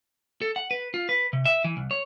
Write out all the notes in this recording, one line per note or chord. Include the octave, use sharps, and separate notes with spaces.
A4
F#5
B4
F4
B4
C3
E5
E3
C2
C#5